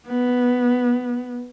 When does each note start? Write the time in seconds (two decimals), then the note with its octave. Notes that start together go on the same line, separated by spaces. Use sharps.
0.08 B3